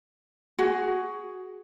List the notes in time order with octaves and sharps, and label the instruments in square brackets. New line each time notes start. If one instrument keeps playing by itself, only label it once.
[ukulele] F#4 G#4